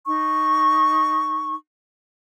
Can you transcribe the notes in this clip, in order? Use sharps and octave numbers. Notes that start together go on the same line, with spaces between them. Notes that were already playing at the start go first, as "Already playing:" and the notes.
D#4 C#6